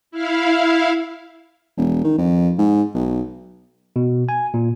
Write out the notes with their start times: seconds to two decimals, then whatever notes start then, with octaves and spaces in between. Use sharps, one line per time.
0.11 E4 F5
1.77 E1
2.04 D#3
2.18 F2
2.58 G#2
2.94 B1
3.96 B2
4.29 G#5
4.54 A#2